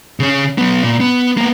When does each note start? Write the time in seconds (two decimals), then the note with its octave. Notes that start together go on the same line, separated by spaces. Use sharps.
0.20 C#3 C#4
0.58 F#3 B3
0.83 A#2
1.00 B3
1.37 A#3 B3